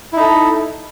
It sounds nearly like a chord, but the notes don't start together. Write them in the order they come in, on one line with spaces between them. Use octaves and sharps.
E4 D#4 A4